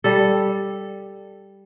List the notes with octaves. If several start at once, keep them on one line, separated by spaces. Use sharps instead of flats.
G3 A4